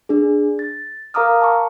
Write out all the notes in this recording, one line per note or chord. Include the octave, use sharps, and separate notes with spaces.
D4 G#4
A6
A#4 F5 A#5 D6 D#6 F6
A5 C#6